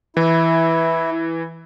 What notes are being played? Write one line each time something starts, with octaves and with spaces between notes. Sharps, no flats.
E3 E4